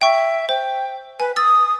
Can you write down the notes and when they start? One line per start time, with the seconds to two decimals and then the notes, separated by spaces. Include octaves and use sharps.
0.01 E5 G5 C#6
0.49 C5 G5
1.20 B4 G#5
1.36 D#6 E6 A6